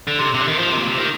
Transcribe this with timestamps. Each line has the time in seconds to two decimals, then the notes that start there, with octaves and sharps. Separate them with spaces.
0.07 D3
0.19 C3
0.34 C3
0.41 D3
0.48 D#3
0.58 F3
0.68 C3
0.78 A#2
0.88 C3
0.98 D#3